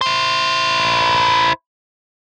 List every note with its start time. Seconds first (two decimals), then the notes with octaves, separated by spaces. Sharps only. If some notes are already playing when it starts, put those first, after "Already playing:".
0.01 E4 C5